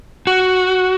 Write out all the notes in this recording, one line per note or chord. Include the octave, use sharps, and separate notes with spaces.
F#4